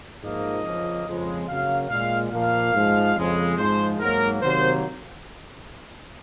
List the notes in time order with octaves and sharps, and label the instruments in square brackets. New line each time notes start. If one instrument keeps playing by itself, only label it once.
[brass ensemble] G#2 F3 A#3 D#5
F2 C#3 F3 A#3
F2 C#3 F3 G#3
F#2 C#3 F#3 A#3 F5
A#2 G#3 F5
A#2 F3 A#3 F5
G#2 F3 G#3
F2 C#3 F3 G#3
G#2 F3 G#3 C5
G#2 F#3 A#3 A#4
C3 D#3 F#3 A#3 C5